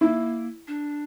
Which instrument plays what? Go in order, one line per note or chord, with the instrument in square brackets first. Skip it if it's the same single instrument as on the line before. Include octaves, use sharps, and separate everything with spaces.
[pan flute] A#3 [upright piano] E4
[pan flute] D4